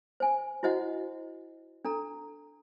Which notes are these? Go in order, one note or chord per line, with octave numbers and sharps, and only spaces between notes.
C5 G#5
E4 F#4 C5 D#5 F#5
D4 A4 A#5